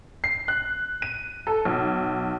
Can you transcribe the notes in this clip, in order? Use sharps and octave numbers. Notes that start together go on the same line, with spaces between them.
C7
F#6
D#7
A4
B1